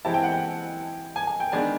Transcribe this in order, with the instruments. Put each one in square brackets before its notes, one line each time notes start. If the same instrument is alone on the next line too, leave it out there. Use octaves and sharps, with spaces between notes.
[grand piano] E3 G#3 C4 E4 G4 [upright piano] A5
[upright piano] G5
F#5
G5
G#5
G#5
G5
[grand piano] D#3 G#3 B3 D4 [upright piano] G#5